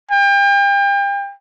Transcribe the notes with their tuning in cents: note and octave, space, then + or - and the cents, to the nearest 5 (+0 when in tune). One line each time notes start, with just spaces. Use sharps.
G5 +35